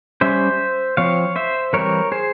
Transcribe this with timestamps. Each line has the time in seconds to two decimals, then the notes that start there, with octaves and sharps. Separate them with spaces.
0.21 G3 C#4 C5 E5
0.97 F3 C4 C#5 F5
1.36 C5 E5
1.73 E3 G3 C4 A#4 C#5
2.12 G#4 C5